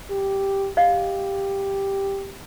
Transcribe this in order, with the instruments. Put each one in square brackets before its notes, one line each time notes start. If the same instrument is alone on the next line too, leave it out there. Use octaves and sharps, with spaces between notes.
[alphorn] G4
[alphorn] G4 [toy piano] D#5 F5